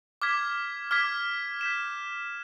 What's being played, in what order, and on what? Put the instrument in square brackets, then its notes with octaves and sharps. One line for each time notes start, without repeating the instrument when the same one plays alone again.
[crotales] D6 F6 G#6 B6
D6 F6 G#6 B6
G6 B6 E7